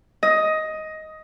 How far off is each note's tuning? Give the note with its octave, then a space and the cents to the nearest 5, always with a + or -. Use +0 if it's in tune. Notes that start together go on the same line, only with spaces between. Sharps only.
D#5 +10